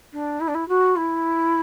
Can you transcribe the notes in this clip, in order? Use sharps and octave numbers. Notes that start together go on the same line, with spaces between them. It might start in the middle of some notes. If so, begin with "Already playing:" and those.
D4
E4
D4
E4
F#4
E4